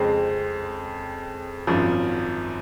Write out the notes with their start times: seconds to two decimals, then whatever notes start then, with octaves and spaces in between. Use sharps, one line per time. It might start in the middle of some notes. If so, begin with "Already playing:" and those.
Already playing: F2 C#3 G#3 C4
1.67 G#1 F#2 F3